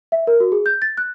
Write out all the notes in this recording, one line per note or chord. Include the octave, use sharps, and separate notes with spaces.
E5
A#4
F#4
G#4
G6
A6
F#6